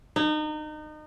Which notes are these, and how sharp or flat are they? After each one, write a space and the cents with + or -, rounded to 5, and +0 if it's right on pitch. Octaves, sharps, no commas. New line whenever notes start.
D#4 -30